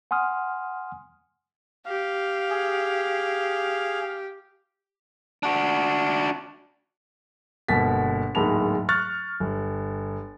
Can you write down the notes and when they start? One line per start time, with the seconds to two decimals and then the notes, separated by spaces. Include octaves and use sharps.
0.11 F#5 G#5 C6 D#6 F6
1.86 G4 F5
2.50 G#4
5.43 D4 F#4
7.69 G1 B2 A#3 A6 B6
8.35 D1 G#2 A#3 A5 B5 F7
8.89 C#6 F6 F#6 A6
9.40 G1